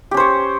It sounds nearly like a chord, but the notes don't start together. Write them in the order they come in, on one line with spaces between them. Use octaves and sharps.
G4 C#4 C5 C#5